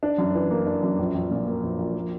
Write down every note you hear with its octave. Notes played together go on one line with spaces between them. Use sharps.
D4
F#2
E3
A#3
D4
F#2
A#1
A#1
A#2
A#3
A#1
A#1
A#3